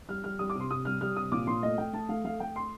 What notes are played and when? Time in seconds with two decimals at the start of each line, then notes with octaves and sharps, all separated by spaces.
0.09 G3 F6
0.24 G3 F6
0.39 G3 D#6
0.49 D6
0.55 C3 C6
0.70 C3 D#6
0.85 G3 F6
1.01 G3 F6
1.16 C3 D#6
1.32 A#2 D6
1.47 A#2 C6
1.63 A3 D#5
1.78 A3 G5
1.93 A3 A5
2.09 A3 F5
2.25 A3 F5
2.40 A3 G5
2.56 C6